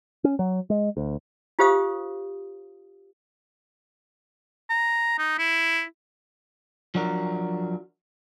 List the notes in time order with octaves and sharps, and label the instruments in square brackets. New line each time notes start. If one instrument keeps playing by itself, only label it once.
[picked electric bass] C#4
F#3
G#3
D2
[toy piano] F4 G4 C5 F5 D#6
[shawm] A#5
D#4
E4
[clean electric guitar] F3 F#3 D4 F#4 A#4